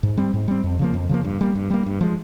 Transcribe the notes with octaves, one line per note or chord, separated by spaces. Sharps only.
G#2
G3 C4
G#2
G3 C4
F2
C#3 F3 A#3
F2
C#3 F3 A#3
G2
G3 A#3
G2
G3 A#3
G2
F3 G#3